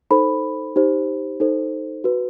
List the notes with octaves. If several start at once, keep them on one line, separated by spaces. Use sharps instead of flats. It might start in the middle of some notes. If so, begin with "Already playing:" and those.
D#4 A4 C5 B5
D#4 G4 C5
D#4 A4 C5
F#4 B4